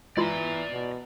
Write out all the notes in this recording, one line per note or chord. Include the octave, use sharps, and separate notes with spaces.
E3 G#3 E4 F4 D5 A#5
B2